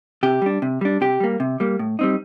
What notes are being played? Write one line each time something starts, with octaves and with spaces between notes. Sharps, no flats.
C3 G4
G3 D4
C3
G3 D4
C3 G4
G3 A#3
C3
G3 A#3
A2
G3 C4 D#4